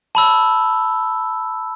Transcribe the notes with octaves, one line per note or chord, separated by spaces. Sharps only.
A5 B5 E6